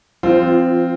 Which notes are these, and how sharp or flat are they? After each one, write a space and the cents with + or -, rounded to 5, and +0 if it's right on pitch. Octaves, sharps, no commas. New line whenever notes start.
F3 -25 C4 +0 F4 +0